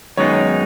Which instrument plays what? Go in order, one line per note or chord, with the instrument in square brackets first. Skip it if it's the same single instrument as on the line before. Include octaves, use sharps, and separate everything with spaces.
[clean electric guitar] F#2 D#3 G#3 B3 D#4 [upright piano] C#5